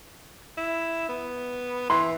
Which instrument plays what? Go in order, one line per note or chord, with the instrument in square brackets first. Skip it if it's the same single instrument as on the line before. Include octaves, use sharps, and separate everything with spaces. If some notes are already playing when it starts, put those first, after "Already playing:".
[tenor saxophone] E4
B3
[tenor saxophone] E3 [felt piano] C6